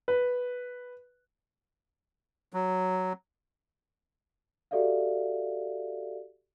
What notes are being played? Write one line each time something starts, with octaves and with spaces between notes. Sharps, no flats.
B4
F#3
F#4 G4 A4 D5 E5 F5